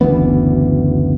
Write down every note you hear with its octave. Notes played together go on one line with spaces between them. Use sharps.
F#1 D2 E3 B3